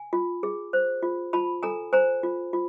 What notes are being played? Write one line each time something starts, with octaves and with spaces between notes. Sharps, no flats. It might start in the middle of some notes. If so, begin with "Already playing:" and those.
Already playing: G#5
F4
G#4
C5
F4
F4 A5 B5
A4 G#5 A#5
C5 G#5 A#5
F4
F4